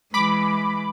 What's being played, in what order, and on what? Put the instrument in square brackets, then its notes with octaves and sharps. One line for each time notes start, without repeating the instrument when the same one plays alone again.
[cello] E3 G#3 [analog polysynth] B5 D6